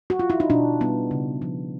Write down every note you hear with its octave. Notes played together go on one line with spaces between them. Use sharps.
F#4
F4
E4
D#4
B2 D4
G3 B3
C#3
F3